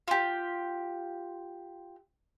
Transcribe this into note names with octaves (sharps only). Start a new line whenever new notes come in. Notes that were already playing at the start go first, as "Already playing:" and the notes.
F4 G4